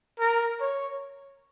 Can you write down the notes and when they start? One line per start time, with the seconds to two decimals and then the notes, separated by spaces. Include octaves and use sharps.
0.20 A#4
0.61 C#5